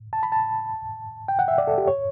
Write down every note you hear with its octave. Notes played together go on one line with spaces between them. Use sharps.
A5
B5
A5
G5
F#5
E5
D5
A4
G4
C#5